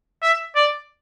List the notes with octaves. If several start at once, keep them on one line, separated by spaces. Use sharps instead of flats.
E5
D5